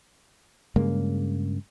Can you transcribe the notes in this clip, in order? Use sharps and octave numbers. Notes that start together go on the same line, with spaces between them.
G2 C#3 G#3 A#3